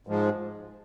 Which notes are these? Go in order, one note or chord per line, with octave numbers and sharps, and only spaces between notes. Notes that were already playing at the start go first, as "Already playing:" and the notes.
G#2 F3 G#3